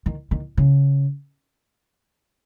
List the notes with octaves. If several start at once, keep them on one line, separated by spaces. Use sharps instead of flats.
D#3
D#3
C#3